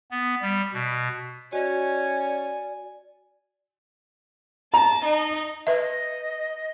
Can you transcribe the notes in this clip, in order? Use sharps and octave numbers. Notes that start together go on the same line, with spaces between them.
B3
G3
B2
C#4 F#4 D5 D#5 G#5
A5 A#5
D#4
B4 D#5 E5